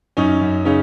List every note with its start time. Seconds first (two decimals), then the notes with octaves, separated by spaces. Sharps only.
0.17 F#2 C#4 D#4
0.41 F#2
0.65 C#3 C#4 D#4